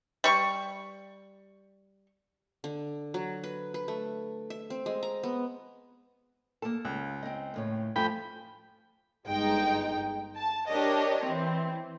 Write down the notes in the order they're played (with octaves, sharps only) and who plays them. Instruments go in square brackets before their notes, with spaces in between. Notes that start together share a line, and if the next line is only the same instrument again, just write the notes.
[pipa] G3 C#6
[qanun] D3
F#3
B4
B4
A3
E5
C4
G#3
A#5
B3
[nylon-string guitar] A#3 A5 [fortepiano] A4
[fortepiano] C#2
[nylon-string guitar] C4 D#5
D#2 A2 C#5
[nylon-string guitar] F2 A3 G#5 [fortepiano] F3 [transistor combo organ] G5 B5
[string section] G1 G#3 D#4 G5
A5
D4 G4 A#4 C#5 D#5
E3 C4